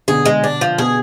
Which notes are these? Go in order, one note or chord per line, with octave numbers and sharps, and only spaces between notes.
B2 D3 G#4
G#3
D4
F3
B2 G#4